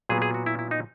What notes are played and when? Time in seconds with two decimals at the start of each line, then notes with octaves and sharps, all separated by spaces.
0.09 A#2 F#3 B3 G#4
0.22 G#4
0.34 F#4
0.46 E4
0.59 E4
0.71 D#4